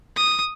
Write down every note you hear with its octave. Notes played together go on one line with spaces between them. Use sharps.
D#6